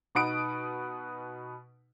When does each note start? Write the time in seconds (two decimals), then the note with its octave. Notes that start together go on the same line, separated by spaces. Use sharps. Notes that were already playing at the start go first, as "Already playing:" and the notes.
0.15 B2 D#4 B4 F#5 D#6 D7